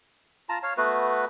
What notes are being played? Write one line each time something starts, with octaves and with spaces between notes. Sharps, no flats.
F4 A5 A#5
C#5 F5
A3 B3 F#4 B4